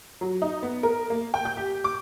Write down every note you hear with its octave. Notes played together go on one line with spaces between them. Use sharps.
F#3
D#4
B3
A#4
A#3
G5
G6
G4
D6